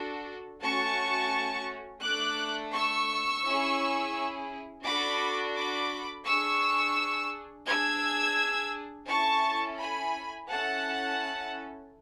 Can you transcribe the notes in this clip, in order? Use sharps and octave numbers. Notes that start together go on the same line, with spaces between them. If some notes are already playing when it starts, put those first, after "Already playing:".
Already playing: D4 F#4 A4
A3 C#4 F#4 A5 C#6
A3 D4 A4 D6 F#6
C#6 E6
C#4 E4 G#4
D4 F#4 A4 B5 D6
B5 D6
D4 G#4 C#6 E6
D4 G#4 E6 G#6
C#4 E4 A4 A5 C#6
G#5 B5
C#4 E4 A4 F#5 A5